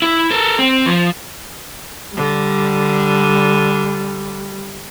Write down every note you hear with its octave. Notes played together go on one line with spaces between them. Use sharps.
E4
A4 A#4
C4
F3
D3 G3